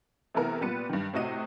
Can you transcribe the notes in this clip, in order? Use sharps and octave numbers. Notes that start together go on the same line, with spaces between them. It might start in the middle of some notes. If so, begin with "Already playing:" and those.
C3 E3 A3 B3 E4 A#4
A#2 G3 B3 B4 C#7
G2 D#3
A2 C3 F#4 D#5 D#7